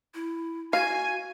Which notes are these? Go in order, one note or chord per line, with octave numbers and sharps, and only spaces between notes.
E4
F#4 F5 G#5